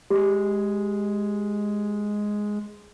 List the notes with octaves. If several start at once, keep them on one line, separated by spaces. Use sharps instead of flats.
G#3 G4